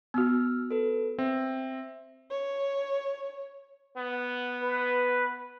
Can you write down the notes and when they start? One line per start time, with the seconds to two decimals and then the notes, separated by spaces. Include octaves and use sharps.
0.14 B3 F#4 E6 F6
0.71 A4 B4
1.19 C4 E5
2.31 C#5
3.97 B3
4.63 B4